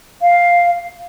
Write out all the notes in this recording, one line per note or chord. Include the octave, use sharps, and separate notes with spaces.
F5